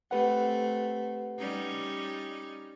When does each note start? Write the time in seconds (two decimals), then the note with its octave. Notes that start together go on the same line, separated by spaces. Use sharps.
0.11 A3 C4 G4 B4 F#5
1.39 G3 C#4 D#4